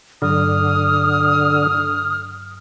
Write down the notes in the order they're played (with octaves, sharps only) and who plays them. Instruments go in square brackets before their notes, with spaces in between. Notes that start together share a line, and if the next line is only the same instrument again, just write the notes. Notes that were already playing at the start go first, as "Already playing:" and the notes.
[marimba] G2 F#3 [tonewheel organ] D3 [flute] D#6 [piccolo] F6